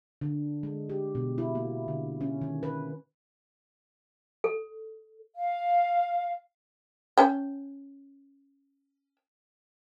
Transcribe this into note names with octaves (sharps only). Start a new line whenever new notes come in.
D3
G#3
G4
B2
E4
A#3
D3
C#4
D#3
B4
A4
F5
C#4 G5